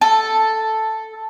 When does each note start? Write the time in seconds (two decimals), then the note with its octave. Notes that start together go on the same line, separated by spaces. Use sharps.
0.01 A4